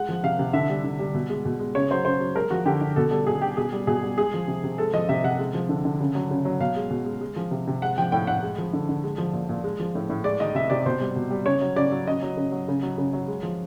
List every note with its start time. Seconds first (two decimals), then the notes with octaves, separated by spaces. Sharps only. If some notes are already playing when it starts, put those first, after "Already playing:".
Already playing: G#3 F#5
0.09 F3
0.23 C3 F5
0.39 C3
0.53 D3 E5
0.69 G3
0.84 D3
0.99 G3
1.14 B2
1.30 G#3
1.45 B2
1.59 G#3
1.75 C#3 C#5
1.91 F#3 C5
2.05 C#3 C5
2.20 F#3
2.35 G#3 A#4
2.50 F3 F#4
2.65 D3 G4
2.81 D3
2.96 B2 A4
3.11 G3 A4
3.27 B2 G#4
3.41 G3 G4
3.57 B2 G#4
3.73 G3
3.87 B2 G#4
4.03 G3
4.17 G#3 G#4
4.34 F3
4.48 C3
4.63 C3
4.78 G#3 A4
4.93 F3 D#5
5.09 C3 E5
5.24 C3 F#5
5.39 G#3
5.54 F3
5.69 D3
5.85 D3
6.00 C#3
6.15 F#3
6.31 C#3
6.45 F#3
6.60 B2 F5
6.76 G#3
6.90 B2
7.06 G#3
7.21 G#3
7.36 F3
7.51 C3
7.67 C3
7.82 G#3 F#5
7.98 F3 G5
8.12 A2 G5
8.27 A2 F#5
8.43 G#3
8.58 F3
8.73 D3
8.89 D3
9.03 G#3
9.18 F3
9.33 A#2
9.49 A#2
9.64 G#3
9.80 F3
9.95 A2
10.10 A2
10.24 G#3 D5
10.40 D#3 D#5
10.55 C3 E5
10.70 C3 D5
10.86 B2 C5
11.00 G3
11.16 B2
11.31 G3
11.46 C#3 C#5
11.61 F#3
11.76 C#3 D5
11.92 F#3
12.07 C#3 D#5
12.22 F#3
12.37 C#3
12.52 F#3
12.68 C#3
12.83 F#3
12.98 C#3
13.13 F#3
13.28 G#3
13.43 F3